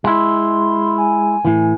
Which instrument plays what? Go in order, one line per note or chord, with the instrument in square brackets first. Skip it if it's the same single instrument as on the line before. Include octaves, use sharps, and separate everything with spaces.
[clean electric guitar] G#3 E4 [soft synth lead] C6
[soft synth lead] G#5
[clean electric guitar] A2 E3